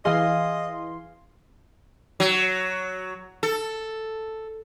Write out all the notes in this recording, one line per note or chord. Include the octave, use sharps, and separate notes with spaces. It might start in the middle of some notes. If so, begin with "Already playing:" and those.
E3 G#4 D#5 F5 C6
F#3
A4